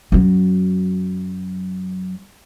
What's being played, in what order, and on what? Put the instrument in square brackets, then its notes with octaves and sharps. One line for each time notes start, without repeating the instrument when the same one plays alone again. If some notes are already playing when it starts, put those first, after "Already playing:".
[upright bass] F#2 F#3